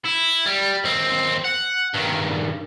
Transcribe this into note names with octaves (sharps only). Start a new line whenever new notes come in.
E4
G3
D#2 C4
F#5
G2 D#3